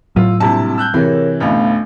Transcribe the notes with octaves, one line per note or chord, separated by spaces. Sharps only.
A2 F#3 F4 E6
A#1 C3 G3 C4 E4 A5
E6 F#6 G6
C3 E3 G#4 A#4 C#5
A1 D2 A3 B3 F5